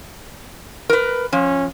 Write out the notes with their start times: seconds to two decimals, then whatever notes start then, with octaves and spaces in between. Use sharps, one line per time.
0.89 A#4 B4
1.33 F3 C#4